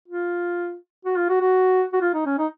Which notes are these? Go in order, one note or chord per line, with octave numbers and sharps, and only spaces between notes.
F4
F#4
F4
F#4
F#4
F#4
F4
D#4
C#4
D#4